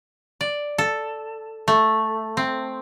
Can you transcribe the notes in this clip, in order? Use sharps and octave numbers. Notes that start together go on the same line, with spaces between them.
D5
A4
A3
C4